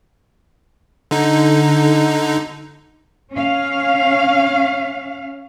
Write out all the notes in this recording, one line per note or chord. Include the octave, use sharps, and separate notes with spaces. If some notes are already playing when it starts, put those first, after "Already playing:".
D3 D#4
C#4 F5